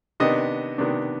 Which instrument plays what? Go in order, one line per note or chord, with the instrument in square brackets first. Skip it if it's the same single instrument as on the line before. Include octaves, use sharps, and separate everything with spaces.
[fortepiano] C3 D#3 B3 D4 D#5
C3 D#3 B3 D4